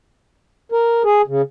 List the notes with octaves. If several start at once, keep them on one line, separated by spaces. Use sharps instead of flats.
A#4
G#4
C#3